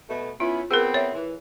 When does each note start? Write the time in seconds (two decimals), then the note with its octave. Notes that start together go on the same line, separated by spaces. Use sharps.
0.09 B2 A3
0.40 B3 C#4 E4 F4
0.71 B3 C4 G#4 A#4
0.94 C#5 E5
1.13 E3